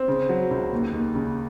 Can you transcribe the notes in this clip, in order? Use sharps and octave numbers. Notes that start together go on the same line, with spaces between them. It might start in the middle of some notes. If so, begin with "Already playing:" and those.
Already playing: C4
C#3
F#3
C#2
D#2
D#2
C#3